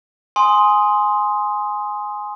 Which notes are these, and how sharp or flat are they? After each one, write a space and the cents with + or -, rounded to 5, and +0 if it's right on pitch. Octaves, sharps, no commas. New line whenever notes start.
G#5 +5 C6 +0 D#6 +10